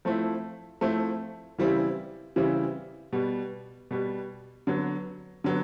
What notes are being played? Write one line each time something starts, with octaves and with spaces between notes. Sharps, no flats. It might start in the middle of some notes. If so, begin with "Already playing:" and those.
F3 A3 C4 E4
F3 A3 C4 E4
C#3 E3 G3 C4 E4
C#3 E3 G3 C4 E4
B2 G3 B3
B2 G3 B3
D3 F#3 B3
D3 F#3 B3